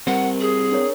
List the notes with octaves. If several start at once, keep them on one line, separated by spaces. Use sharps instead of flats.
G3 C4 G4 A#4 C5 F#5
G#4
D4 A#4 C#5